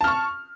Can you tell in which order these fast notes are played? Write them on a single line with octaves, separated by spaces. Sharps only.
A5 F6 C#6